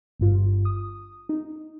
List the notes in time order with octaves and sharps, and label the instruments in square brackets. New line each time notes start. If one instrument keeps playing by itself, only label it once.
[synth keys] G1 G2 F4
D#6
D#4